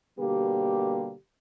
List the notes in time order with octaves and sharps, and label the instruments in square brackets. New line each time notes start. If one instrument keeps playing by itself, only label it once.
[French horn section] B2 D3 G3 A#3 G4